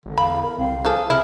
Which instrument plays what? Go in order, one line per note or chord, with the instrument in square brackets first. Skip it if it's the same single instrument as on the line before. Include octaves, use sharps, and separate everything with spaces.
[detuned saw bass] G#1 [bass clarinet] D3
[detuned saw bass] E2 [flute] F5 [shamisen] B5
[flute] A#4
[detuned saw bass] C2 [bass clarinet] C4 [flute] F5
[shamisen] E3 F3 A4 [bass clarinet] G#4
[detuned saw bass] C3 [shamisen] E4 [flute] F6